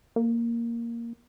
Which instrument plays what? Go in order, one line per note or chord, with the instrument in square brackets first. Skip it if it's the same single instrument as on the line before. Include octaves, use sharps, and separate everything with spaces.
[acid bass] A#3